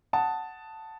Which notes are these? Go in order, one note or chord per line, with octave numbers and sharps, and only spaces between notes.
F#5 A5 D#6